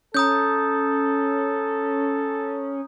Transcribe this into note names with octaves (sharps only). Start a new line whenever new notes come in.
C#4 A4 A#5 D#6 G6